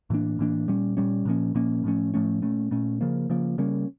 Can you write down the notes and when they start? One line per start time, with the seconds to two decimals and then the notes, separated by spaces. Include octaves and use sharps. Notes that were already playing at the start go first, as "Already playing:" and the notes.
0.10 A2 E3 A#3 D4
0.39 A2 E3 A#3 D4
0.68 A#2 G3 C#4
0.97 A#2 G3 C#4
1.25 A#2 F3 A#3 C#4
1.55 A#2 F3 A#3 C#4
1.84 A2 F3 A3 C#4
2.14 A2 F3 A3 C#4
2.42 A#2 A3 C#4
2.71 A#2 A3 C#4
3.01 C#3 F3 A#3
3.30 C#3 F3 A#3
3.58 C#3 G3 A#3 C#4